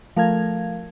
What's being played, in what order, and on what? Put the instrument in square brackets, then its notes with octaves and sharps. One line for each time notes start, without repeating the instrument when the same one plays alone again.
[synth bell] F3 A3 A#4 F5 G#6